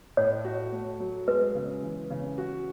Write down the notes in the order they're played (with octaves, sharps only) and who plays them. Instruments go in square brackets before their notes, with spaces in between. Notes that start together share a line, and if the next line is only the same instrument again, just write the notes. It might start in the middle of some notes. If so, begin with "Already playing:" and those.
[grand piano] A2 [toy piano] C#5
[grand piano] F#4
A3
F#3
[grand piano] G#3 [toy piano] B4
[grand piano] C#3
E3
C#3
F#4